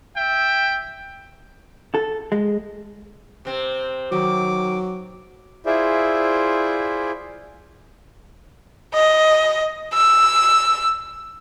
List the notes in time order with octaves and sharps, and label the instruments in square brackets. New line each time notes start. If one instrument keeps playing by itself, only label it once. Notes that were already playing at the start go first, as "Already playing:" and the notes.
[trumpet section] E5 G5
[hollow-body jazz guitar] A4
G#3
[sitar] C3 C4
[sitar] D#3 [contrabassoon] F#3 [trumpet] D6
[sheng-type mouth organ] E4 F4 G#4 C5 D5 E5
[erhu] D#5
E6